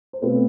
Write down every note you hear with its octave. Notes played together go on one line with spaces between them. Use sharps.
C5
B2 A3 C4 F4 B4